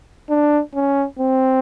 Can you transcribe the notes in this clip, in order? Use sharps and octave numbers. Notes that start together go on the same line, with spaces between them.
D4
C#4
C4